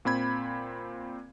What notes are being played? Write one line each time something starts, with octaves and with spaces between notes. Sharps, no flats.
A#2 C4 B5 G#6